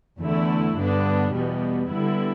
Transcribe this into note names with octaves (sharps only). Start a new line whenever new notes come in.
E2 D3 A3 E4
G2 D3 B3 D4
E2 B2 G3 B3
D3 G3 B3 E4